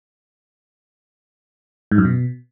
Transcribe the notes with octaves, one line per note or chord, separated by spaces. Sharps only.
G#2
F#2
B2